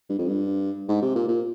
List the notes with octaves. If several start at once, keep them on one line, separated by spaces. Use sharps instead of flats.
G2
F2
G2
G#2
C3
A#2
A#2